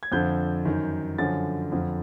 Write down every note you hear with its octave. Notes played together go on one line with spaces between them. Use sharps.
G#6
F2 D3 F3 G6
F#2 D#3
F#2 D3 F3 A6
F2 D3 F3